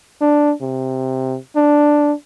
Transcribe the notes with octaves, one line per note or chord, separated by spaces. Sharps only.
D4
C3
D4